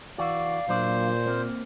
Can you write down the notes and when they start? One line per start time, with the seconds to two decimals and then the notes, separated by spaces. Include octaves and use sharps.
0.18 E3 F#4 D5 F5
0.69 A#2 F#3 D4 C5 D5
1.26 A#3 C4